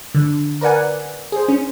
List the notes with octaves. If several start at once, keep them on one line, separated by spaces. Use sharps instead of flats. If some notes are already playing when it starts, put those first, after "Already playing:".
D3
A#4 B4 D5 F#5 G#5
G#4 C5
C#4